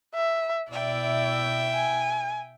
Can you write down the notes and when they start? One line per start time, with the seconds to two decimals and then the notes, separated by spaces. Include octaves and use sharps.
0.15 E5
0.71 B2 E4 D5 E5 G5
1.75 G#5